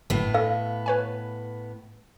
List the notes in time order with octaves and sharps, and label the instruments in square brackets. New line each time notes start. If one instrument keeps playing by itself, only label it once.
[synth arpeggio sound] G1 [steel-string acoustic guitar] A2 B3
[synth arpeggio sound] A4 [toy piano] F5
[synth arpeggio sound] B4 C#5 G#5